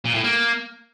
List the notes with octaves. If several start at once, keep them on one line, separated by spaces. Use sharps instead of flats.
A#2
A2
A#3